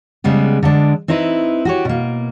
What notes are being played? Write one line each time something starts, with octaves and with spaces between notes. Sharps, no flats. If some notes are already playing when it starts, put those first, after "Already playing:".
C#3 G3 G#3 B3
D3 G#3 D4
C4 D#4 E4 B4
F#4 G4 C#5
B2 A#3